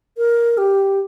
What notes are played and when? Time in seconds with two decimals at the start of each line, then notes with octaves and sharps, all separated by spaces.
0.17 A#4
0.58 G4